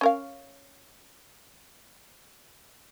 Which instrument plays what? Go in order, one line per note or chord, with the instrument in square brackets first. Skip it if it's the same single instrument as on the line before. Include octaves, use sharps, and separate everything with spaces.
[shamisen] C#4 A#4 F5